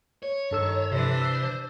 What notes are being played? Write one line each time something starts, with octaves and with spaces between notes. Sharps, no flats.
C#5
G2 D#3 A4 E6
C3 E3 D4 C5
E6